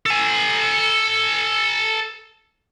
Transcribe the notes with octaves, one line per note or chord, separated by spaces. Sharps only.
A4 G#5